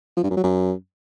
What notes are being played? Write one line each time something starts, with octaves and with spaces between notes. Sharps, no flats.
F3
G2
F#2
F#3
F#2